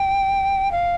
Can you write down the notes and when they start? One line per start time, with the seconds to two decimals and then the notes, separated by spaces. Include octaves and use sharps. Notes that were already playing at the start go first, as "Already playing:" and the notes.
Already playing: G5
0.72 F5